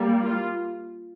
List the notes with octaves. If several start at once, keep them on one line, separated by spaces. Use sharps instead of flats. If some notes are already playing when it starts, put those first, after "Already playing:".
Already playing: G3 A#3
F4